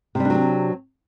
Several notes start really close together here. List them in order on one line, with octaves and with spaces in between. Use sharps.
C3 G3 D4 F#3 C4